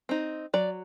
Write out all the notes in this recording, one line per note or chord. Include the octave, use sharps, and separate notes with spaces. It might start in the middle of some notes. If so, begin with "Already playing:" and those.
C4 D#4
F#3 D5